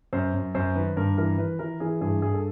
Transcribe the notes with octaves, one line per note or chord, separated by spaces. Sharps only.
F#2 C5
F#2
F#2 C5
D#3 B4
G2 A#4
E3 A#4
E3 B4
E3 A#4
E3 G#4
G2 G#4
G2 G#4
A4